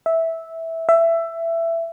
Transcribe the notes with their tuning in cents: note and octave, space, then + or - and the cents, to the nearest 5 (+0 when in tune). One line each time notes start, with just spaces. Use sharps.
E5 -10
E5 +15